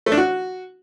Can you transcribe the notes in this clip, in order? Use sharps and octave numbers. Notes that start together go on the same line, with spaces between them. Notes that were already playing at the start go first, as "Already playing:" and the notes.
A3
D4
F#4